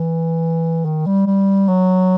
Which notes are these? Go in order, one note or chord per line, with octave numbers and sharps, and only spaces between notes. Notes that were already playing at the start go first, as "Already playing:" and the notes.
Already playing: E3
D#3
G3
G3
F#3